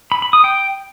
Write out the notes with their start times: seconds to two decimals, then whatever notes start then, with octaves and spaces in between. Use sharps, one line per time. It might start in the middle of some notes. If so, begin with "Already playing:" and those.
0.12 B5
0.22 B5
0.33 D#6
0.44 G5